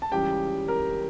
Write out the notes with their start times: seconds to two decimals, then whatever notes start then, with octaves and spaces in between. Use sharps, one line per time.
0.02 A5
0.12 C#2 C#3 E3 G3 G4 G5
0.68 A#4 A#5